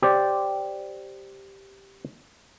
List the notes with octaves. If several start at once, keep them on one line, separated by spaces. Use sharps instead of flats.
G4 C5 D5